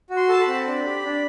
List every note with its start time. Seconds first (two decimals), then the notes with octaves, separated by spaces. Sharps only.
0.10 F#4
0.16 C6
0.29 A4 A5
0.41 B5
0.47 C4
0.67 D4
0.86 G4
1.05 D4